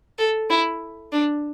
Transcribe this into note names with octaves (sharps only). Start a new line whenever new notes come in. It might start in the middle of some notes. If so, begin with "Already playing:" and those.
A4
E4
D4